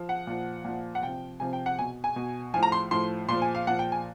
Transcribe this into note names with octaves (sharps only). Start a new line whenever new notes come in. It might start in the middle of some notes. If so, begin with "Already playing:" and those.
Already playing: F3
F#5
A#2 F3
A#2 F3
F#5
C3 F3 G5
C3 F3 G#5
G5
F#5
B2 G#5
G#5
B2
A2 F3 G#5
A#5
C6
A2 F3 C6
A#2 F3 C6
G#5
F5
A#2 F3 F#5
G5
G#5